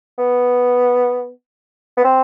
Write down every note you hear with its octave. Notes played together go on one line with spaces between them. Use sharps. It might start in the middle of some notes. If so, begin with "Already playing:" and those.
B3
B3
C4